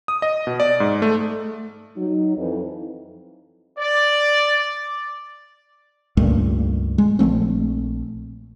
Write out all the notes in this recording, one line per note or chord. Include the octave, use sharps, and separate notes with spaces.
D#6
D#5
B2
D5
G#2
A3
F#3 D#4
F2 E3 D#4
D5
C#2 G2 A#2 A3
G#3
A#1 F3 A3 C4